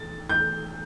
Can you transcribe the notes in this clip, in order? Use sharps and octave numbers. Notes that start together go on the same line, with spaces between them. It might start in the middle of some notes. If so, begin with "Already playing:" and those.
Already playing: A6
G6